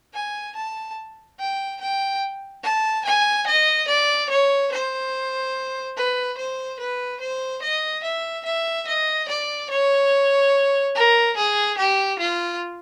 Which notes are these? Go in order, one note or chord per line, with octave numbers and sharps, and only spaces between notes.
G#5
A5
G5
G5
A5
G#5
D#5
D5
C#5
C5
B4
C5
B4
C5
D#5
E5
E5
D#5
D5
C#5
A#4
G#4
G4
F4